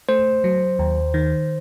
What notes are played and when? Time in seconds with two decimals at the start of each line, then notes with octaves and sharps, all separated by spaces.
0.09 A3 C5
0.44 F#3
0.79 D#2
1.14 D#3